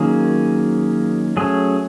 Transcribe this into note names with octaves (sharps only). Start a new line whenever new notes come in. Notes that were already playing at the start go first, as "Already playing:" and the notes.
Already playing: D#3 F#3 A#3 C#4 G#4
F#3 A3 C#4 G#4